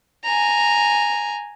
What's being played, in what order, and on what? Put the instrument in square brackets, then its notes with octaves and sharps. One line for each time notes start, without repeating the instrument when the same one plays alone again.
[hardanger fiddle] G#5 A#5